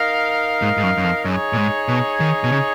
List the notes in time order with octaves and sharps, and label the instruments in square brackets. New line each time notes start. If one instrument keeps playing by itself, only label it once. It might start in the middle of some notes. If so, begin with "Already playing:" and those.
Already playing: [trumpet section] D#4 A#4 F5
[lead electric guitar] G#2
G#2
F#2
F#2
F2
[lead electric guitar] F#2 [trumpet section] D#4 G#4 C#5
[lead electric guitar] A#2
G#2
B2
D#3
B2
C#3